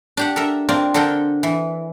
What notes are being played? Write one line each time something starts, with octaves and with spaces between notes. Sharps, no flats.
D4 G4 F#5
A4 A#4 E5
C4 D4 F4 A#4 D5
D3 D4 A4 A#4 G5
E3